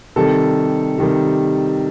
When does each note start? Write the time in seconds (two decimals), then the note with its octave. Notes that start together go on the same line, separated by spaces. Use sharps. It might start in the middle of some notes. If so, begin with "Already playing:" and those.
0.16 C3 D#3 G3 A4
0.98 C3 D#3 G3